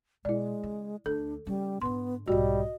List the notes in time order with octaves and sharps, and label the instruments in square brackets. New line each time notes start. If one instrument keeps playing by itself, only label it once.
[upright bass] B2 [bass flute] G#3 [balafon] E4 D5
[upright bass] C#3
[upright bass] D2 [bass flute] D4 [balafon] A4
[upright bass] C#3 C#4 [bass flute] G3
[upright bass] G#2 D3 [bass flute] B3 [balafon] C6
[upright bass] B1 G#2 [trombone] G3 [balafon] F#4 [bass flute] D#5